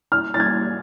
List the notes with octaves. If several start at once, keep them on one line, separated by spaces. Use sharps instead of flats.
F6
A6
G#6